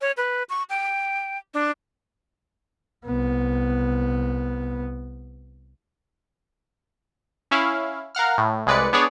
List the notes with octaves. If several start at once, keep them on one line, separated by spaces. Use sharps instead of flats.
C#5
B4
C#6
G5
D4
C2 B3
C#4 E4 F5
A#4 F5 F#5 F6
A2
C2 G#3 B4 D5 C#7
B3 D4 G#4 C#5 D5